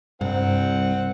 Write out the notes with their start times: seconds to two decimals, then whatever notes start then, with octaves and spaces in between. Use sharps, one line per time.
0.21 C2 G2 C4 F#5